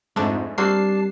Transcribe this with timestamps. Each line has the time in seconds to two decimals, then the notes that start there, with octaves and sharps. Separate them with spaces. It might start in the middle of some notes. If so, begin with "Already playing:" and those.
0.16 F2 G#2 A3 D4
0.58 G3 A#3 C4 D4 F#4 A5 C7